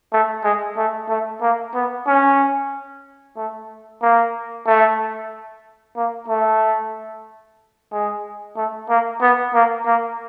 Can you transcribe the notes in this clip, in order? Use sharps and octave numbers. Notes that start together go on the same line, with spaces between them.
A3
G#3
A3
A3
A#3
B3
C#4
A3
A#3
A3
A#3
A3
G#3
A3
A#3
B3
A#3
A#3